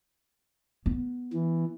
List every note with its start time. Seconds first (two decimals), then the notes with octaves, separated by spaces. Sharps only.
0.86 B3
1.33 E3